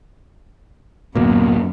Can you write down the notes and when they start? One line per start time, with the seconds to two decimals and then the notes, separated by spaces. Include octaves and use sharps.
1.15 D1 F#2 B2 A#3 B3